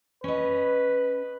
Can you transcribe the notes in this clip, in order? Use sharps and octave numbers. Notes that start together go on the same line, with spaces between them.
C#4 B4 D#5